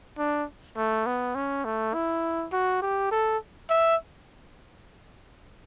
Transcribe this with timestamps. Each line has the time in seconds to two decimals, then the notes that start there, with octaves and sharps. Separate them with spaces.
0.18 D4
0.77 A3
1.06 B3
1.35 C#4
1.65 A3
1.94 E4
2.52 F#4
2.82 G4
3.11 A4
3.70 E5